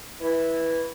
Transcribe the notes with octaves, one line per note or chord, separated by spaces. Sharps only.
E3 E4